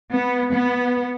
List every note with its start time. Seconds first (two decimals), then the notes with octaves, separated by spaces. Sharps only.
0.12 B3
0.52 B3